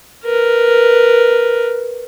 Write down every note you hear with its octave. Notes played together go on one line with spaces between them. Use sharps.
A#4 B4